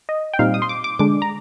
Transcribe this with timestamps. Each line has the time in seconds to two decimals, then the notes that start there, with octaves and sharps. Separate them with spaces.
0.09 D#5
0.34 G5
0.39 A#2 G3 C4 D#4 F5
0.54 D#6
0.62 C6
0.69 D6
0.84 D6
0.99 D3 G#3 D4 D6
1.22 A#5